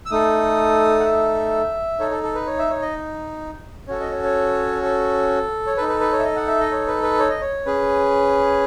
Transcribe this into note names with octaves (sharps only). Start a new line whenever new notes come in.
E6
A3 D#4 A4 D#6
F#5
E5
D#4 A4 C#5
A4
A4
B4
C#5
E5
C#5
D#5
C#4 F#4 A4 C#5
D#5
C#5
C#5
A4
C#5
D#4 A4 B4
B4
B4
C#5
E5
D#5
F#5
E5
D#5
C#5
B4
B4
C#5
D#5
C#5
C#4 G#4 B4